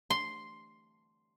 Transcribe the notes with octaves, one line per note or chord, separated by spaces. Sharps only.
C6